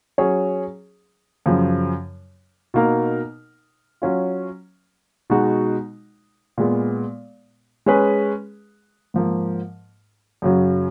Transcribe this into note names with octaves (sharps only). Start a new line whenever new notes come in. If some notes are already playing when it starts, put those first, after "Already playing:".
F#3 C#4 G#4 C#5
F#2 C#3 F3
B2 A#3 D#4 A#4
F#3 C#4 F4
B2 G#3 D#4 F#4
A#2 G#3 B3
G#3 C#4 G#4 B4
G#2 F3 A#3
F#2 C#3 F#3